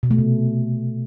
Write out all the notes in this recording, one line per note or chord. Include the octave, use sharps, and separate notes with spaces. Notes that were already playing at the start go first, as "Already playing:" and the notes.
B2
A3
C3